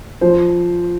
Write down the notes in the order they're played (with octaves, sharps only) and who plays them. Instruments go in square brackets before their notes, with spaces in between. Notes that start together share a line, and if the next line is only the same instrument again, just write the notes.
[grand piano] F3 C5